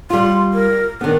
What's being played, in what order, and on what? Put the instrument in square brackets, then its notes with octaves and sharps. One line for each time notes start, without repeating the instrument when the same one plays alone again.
[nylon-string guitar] G3 F4 [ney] C6
[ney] A#4
[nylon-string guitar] D#3 B3 [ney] D4